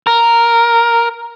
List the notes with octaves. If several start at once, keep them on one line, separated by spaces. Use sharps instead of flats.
A#4